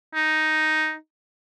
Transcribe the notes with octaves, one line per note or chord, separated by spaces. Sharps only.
D#4